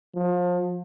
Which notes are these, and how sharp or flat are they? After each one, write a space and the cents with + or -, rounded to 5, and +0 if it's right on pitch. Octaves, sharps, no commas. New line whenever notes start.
F3 +30